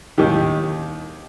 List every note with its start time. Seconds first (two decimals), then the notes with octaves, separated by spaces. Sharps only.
0.18 D#2 D#3 G4